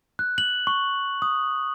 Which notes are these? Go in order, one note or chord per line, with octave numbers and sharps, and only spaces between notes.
F#6
F#7
C#6
D#6